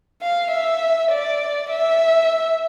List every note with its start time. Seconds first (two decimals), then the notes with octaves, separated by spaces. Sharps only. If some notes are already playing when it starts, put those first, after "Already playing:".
0.22 F5
0.51 E5
1.11 D5
1.70 E5